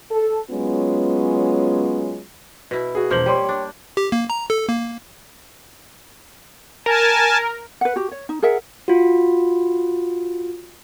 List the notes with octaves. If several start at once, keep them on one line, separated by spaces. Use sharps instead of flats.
A4
F#3 G#3 B3 C#4 F4
B2 E4
F#4 G#4
E1 F3 A#3 G6 F#7
G3 G4 C#5 C6
D4
G4
A#3
A#5
A4
A#3
A#4 G#5 A5
B4 F#5
F#4 G4
C#5
D#4
G#4 A#4 E5 F#5
F4 F#4